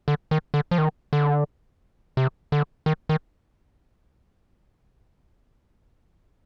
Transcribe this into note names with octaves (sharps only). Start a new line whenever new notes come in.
D3
D#3
D3
F3
D#3
D3
C3
D3
D#3
D#3